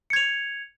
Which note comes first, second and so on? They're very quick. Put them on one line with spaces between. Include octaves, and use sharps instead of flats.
C#7 G#6 F7